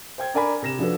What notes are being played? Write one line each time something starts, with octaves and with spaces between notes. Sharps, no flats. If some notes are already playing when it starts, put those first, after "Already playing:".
C5 G5 G#6
D4 A#4 D5 G#5 A#5 B5
C3 A#6 E7
F3 D4 F#4 A4 B4